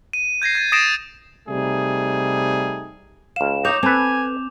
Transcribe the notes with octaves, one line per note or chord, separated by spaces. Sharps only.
D#7
G6 G#6 A#6 C7
G#6 A6 D#7
D#6 A6 A#6 C7 D7 E7
C3 G3 A3 D#4 G#4
C#2 F5 E7
D#4 C#5 D6 G6 F7
C4 A4 B4 G#5